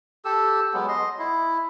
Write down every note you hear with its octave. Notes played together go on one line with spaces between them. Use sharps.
G4 A4 E6
F#3 G#3 B3
D#5 C6
E4